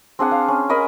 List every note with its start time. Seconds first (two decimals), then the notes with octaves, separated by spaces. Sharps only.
0.19 C4 D4 G#4 F#5
0.31 F5
0.48 C#4
0.69 A#4 D#5 G#5 B5